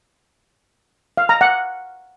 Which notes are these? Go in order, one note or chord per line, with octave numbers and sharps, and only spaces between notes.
F5
A#5
F#5